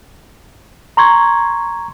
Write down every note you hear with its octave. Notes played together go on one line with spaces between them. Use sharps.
A#5 C6 C#6 G#6